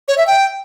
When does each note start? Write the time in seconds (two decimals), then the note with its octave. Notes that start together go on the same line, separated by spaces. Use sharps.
0.08 C#5
0.18 E5
0.27 G5